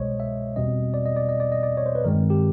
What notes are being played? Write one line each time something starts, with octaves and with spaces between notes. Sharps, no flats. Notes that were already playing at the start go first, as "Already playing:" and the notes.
Already playing: C2 B2 G#3 C5 C#5 D#5
E5
E2 B2 G3 C4 D#5
D5
D#5
D5
D#5
D5
D#5
D5
C#5
C5
B4
G2 D#3 G#3 C4 A#4
G4